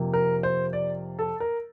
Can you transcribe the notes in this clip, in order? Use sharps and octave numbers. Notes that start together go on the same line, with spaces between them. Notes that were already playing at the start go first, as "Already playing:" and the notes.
Already playing: F2 C3 F3 A#3
A#4
C5
D5
A4
A#4